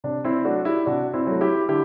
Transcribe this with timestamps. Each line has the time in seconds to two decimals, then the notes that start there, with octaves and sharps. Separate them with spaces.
0.04 C3 D4
0.25 C4 E4
0.44 F#3 A3 D4 F#4
0.65 E4 G4
0.86 C3 D4 F#4
1.14 C4 E4
1.27 F#3 A3
1.41 E4 G4
1.69 D3 E4 G4